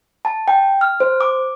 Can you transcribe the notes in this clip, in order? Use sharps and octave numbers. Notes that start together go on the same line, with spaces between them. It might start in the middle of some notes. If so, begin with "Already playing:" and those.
A5
G5
F6
C5
D6